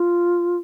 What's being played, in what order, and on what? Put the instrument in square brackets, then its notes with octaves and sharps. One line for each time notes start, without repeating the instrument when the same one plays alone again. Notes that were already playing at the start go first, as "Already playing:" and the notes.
Already playing: [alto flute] F4